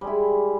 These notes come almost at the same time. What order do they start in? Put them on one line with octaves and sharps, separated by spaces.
G3 G#3 E4